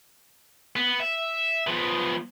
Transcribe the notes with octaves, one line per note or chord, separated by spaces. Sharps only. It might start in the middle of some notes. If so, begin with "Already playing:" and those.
B3
E5
F3 B3